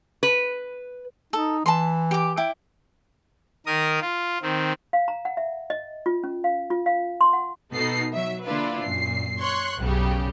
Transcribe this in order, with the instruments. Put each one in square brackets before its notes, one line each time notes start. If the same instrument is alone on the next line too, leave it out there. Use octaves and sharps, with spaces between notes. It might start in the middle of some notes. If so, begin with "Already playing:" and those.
[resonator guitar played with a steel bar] B4
[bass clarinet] D#4 [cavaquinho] A4
[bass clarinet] E3 [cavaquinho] A5 B5 C6
[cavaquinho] G4 D6
E4 G5 D6
[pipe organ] D#3 A#4 D#6
F4
D#3 C4
[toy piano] F5
A#5
F#5
E5
D#5
F4
C#4
F5
F4
F5
C6
F#5
[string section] B2 B3 D#4 A4 C7
F#3 E5
D3 A#3 D4 E4 F4 B4
F#2 A#2 C7
C#5 C6 C#6 F#6
B1 F#2 C#3 G3 G4